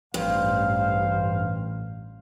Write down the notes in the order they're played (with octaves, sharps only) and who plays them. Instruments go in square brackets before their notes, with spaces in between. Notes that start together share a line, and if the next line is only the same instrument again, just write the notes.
[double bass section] A1 [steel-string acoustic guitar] G2 [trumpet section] C5 F5